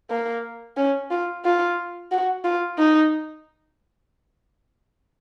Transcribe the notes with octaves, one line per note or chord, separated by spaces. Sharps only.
A#3
C#4
F4
F4
F#4
F4
D#4